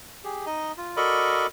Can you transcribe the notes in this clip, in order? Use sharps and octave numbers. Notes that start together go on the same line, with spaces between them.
G4 G#4
D#4 D#5
F4
F#4 A4 A#4 D5 D#5 B5